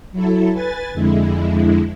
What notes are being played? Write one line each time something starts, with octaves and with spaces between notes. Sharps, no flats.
F#3 E4 A4
B4 G#5 A6
F2 D3 G#3 E4